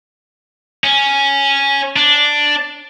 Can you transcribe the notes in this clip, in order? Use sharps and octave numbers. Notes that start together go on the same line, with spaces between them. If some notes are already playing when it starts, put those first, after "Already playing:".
C#4
D4